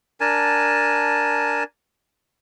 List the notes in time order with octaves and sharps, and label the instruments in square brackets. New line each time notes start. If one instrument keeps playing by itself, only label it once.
[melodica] D4 A#4 G#5 A5